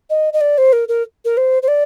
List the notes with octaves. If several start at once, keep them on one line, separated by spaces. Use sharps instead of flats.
D#5
D#5
D5
C5
A#4
A#4
A#4
C5
C5
D5